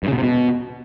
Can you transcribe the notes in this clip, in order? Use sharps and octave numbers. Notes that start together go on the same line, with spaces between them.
G2
C#3
B2
C3
B2